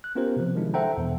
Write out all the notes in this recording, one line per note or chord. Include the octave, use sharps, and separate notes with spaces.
F#6
B3 C#4 F4 G4 A#4 C5
C3 F3
D#3 F3 G#3 D4 E4
A4 C5 E5 F#5 G5 A#5
E2 B2 E3